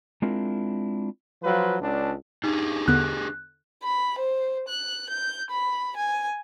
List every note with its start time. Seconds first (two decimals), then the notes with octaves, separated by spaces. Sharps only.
0.22 G#3 C4 D4 E4 F4 A#4
1.42 F3 F#3 F4 B4
1.81 C#2 D4
2.44 D4 D#4 G4 G#4
2.88 E2 D3 B3 F#6
3.83 B5
4.19 C5
4.68 F#6
5.10 G6
5.51 B5
5.97 G#5